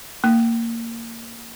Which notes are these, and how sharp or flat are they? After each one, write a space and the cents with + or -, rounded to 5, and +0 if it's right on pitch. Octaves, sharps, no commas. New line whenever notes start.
A#3 -15